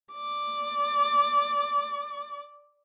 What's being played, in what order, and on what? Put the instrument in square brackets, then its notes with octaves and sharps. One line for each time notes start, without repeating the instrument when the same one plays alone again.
[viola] D5 D6